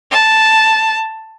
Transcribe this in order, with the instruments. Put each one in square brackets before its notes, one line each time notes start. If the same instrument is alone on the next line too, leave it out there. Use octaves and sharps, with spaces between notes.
[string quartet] A5